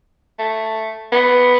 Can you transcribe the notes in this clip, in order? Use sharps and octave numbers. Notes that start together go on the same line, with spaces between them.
A3
B3